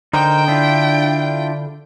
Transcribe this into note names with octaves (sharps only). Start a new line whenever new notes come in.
D3 D#4 A#4 C5 G5
D4 E4 F4